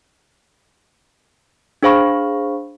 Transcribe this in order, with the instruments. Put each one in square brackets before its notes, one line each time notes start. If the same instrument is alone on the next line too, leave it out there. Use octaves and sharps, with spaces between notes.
[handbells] D4 G#4 C5 F5 B5 C#6